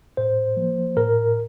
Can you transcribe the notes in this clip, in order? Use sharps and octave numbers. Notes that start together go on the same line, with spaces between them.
A2 C5
F3 A#3
A2 A#4